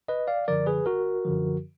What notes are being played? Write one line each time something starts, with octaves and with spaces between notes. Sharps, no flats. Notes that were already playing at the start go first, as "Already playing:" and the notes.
G#1 B4 D#5
D5 F5
F#2 D3 F3 A#4 D5
G#4 B4
G#1 F#4 A#4
F#2 D3 F3